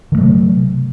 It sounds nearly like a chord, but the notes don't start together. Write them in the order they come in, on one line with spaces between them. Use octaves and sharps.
D#3 A3 F#3 C3